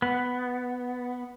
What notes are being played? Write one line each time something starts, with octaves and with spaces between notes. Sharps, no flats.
B3